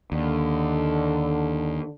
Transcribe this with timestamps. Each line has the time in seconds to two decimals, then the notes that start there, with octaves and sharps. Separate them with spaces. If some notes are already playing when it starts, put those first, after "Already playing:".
0.12 D#2 D3